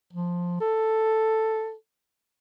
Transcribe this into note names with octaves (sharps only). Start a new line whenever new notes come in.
F3
A4